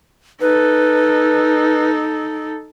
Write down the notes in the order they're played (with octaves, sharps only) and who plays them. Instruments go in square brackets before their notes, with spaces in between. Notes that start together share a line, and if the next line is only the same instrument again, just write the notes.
[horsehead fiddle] D#4 A4 [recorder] B4